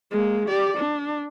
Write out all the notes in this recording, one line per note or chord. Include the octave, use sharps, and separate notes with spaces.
G#3 A#3
G4 D5
D4